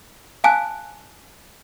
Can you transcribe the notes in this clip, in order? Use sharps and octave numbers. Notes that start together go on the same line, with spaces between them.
F5 G#5 A5 F#6